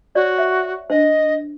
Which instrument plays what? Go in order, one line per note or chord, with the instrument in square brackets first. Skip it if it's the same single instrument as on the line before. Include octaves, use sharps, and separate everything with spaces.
[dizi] F#4 [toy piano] C#5 D5
[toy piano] E5
[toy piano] D4 C5 [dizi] D#5